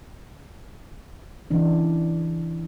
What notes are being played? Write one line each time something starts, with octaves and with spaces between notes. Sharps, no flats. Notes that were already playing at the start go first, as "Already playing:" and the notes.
C#3 E3 D4